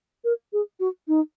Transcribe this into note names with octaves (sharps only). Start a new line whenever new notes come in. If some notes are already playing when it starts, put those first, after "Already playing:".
A#4
G#4
F#4
D#4